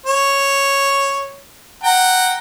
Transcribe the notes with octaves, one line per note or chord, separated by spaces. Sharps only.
C#5
F#5 G5 A#5